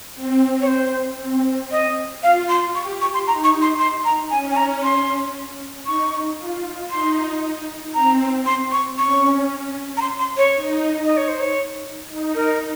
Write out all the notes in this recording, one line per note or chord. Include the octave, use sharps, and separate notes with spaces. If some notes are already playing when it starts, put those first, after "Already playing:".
C4
C#5
C5
C4
D#5
F4 F5
C6
G4 C#6
C#6
C6
D#4 A#5
C#6
C6
C6
A#5
C#4 G#5
G#5
A#5
C6
D#4 C#6
F4
D#4 C6
C4 A#5
C6
C#6
C#4 C#6
A#5
C6
C6
C#5
D#4
D#5
C#5
C5
C#5
D#4
A#4